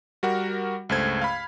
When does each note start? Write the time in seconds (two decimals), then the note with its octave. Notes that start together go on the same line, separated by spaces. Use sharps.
0.23 G3 F#4 A#4 F#5
0.89 C#2 G2 A3 C5 G#6
1.21 F5 B5